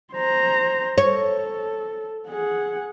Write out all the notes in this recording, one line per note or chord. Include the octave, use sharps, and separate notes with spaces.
C5 A#5
A4 C#5
G#4 F#5